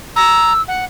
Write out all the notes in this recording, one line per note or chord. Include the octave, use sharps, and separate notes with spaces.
A#5 E6
F#5